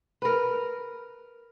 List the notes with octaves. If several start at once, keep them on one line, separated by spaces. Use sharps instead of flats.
A#4 B4